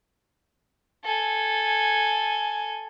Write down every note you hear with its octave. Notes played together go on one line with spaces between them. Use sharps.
A4 G#5